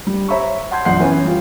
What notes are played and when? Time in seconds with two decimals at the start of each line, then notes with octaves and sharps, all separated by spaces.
0.07 G3
0.28 C5 C#5 E5 A#5 B5 C#6
0.71 F#5 A5 C6 G6 G#6 C7
0.85 A#1 F#2 F#5 C6 G6 C7
1.00 E3 B3 C#4
1.24 G3 F4 G4